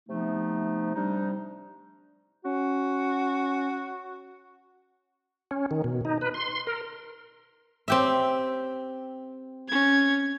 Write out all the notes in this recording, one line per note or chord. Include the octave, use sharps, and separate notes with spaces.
C3 F3 A3 B3 D#4
C3 G3 D4 D#4
C#4 F#4
C#4
D#3
B2
D#4
B4
C6
A#4
C4 G4 E5
C#4 G#6